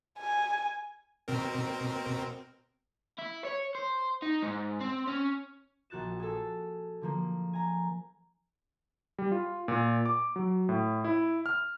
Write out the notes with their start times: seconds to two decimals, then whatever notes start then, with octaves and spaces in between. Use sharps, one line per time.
0.19 G#5
1.28 B2 C4 A#4
3.18 E4
3.45 C#5
3.75 C5
4.22 D#4
4.42 G#2
4.80 C4
5.07 C#4
5.90 A#1 F#4 F#6 A6 E7
6.19 G#4 A4
7.01 D3 F3 A#3
7.53 G#5 A#5
9.19 G3
9.32 F4
9.68 A#2
10.06 D6
10.36 F#3
10.69 A2
11.04 E4
11.46 F6